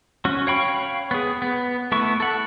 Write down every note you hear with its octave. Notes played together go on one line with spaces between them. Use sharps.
C#4 F#4
C#5 F5 G5 B5 C#6
B3 G#4
B3
A3 B3 E4 C#6
A4 F#5